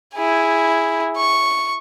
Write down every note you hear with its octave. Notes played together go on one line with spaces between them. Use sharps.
E4 G#4
C#6